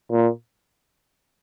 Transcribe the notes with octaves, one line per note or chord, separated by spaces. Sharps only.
A#2